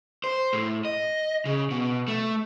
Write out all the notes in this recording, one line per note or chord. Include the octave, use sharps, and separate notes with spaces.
C5
A2
D#5
C#3
B2
A3